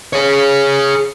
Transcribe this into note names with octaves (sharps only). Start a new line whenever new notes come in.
G#4 C#5